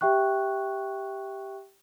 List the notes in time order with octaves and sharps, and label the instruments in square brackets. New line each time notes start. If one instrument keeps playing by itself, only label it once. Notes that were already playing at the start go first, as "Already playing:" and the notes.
[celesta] G4 E5 G5 C#6 F#6